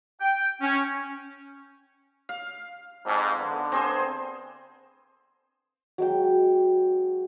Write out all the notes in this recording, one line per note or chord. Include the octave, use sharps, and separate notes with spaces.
G5
C#4
F5
F2 G#2
D3 B3
C4 G#4 C5
F#3 G#3 G5